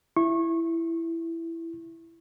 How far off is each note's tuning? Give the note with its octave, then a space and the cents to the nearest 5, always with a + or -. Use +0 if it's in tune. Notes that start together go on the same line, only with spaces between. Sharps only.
E4 +10 C#6 -25